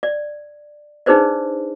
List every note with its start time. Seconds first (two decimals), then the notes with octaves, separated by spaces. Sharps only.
0.03 D5
1.06 D4 D#4 G#4 B4 C5 D5